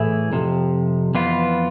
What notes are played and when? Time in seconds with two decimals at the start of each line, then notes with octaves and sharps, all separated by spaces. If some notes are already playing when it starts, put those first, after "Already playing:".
Already playing: A2 E3 A3 E4 G#4
0.33 F2 C3 F3
1.15 F2 E3 B3 F4